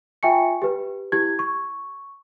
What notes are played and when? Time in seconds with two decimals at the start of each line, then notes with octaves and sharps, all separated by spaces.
0.23 F4 E5 G5 G#5 C#6 C#7
0.62 G4 B4
1.12 E4 G4 G#6
1.39 C#6